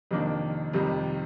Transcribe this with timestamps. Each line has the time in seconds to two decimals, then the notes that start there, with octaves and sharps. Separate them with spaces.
0.11 F2 C3 D#3 A#3 D4
0.73 F2 C3 D#3 G3